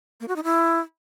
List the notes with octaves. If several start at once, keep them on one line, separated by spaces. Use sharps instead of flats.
A#3
F#4
D#4
E4